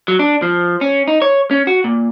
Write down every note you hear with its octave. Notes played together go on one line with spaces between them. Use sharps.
F#3
D4
F3
C#4
D#4
C#5
C#4
F#4
A#2